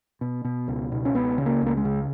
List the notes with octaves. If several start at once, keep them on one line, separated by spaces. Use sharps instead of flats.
B2
B2
C#2
B2
C#4
C#2 B3
C#3
A#3
C#2 A#3
G#3
C#3